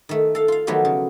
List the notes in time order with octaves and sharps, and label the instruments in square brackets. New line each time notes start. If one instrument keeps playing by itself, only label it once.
[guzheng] D#3 A3
A4 F5
F4 F5
D#3 F3 F#3 A3 B3 G4
C#3